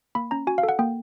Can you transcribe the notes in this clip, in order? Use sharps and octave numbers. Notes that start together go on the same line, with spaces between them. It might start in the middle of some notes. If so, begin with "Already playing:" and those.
A#3 B5
C#4 A#5
F#4 G#5
F5
A4
F#5
A#3 G5